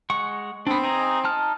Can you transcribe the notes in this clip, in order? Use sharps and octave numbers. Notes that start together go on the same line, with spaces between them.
G#3 F#5 C#6
B3 C4 D4
D#4 G#4 A#5
D#4 A5 F6